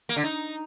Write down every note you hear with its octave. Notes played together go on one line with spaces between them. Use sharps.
A#3
D3
D#4